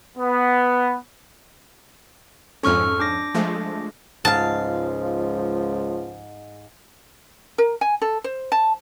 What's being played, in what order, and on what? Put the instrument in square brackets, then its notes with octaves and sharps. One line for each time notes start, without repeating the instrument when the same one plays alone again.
[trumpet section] B3
[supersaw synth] F2 G#2 C#4 [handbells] A4 C#6 F6
[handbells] D4 D6 A#6
[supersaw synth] F3 G#3 A3
[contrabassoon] C#2 [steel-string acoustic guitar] G#2 F5 [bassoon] F3 [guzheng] A5
[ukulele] A#4
G#5
A4
C5
A5